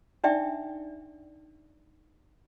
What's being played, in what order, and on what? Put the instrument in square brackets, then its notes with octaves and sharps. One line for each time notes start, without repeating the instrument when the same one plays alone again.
[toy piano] D4 D#4 D5 E5 G5